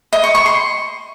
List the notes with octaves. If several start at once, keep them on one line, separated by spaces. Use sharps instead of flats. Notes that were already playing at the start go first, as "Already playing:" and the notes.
D#5
C#6
C#6
C6